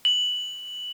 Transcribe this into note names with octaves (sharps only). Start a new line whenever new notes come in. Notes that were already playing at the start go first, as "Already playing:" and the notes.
F#7